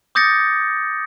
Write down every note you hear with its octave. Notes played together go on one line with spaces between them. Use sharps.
D6 D#6 G6 A6 A#6 C#7